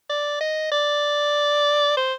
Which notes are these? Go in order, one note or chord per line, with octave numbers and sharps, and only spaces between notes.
D5
D#5
D5
C5